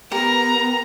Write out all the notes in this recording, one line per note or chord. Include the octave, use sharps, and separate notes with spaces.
B3 G4 A#4 A#5